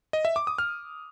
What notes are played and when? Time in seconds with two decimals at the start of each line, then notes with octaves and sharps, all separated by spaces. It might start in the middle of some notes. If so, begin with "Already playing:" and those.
0.13 D#5
0.25 E5
0.36 D6
0.47 D#6
0.58 F6